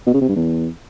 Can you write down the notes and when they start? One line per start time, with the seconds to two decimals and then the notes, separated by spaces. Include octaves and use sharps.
0.07 B2
0.14 C#3
0.21 C3
0.28 G2
0.36 E2